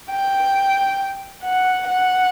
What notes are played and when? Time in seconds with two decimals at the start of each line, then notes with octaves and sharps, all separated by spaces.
0.11 G5
1.44 F#5
1.88 F#5